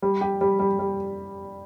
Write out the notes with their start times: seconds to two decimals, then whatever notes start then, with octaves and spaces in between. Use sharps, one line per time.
0.02 G3
0.21 G4
0.41 G3
0.59 G3
0.79 G3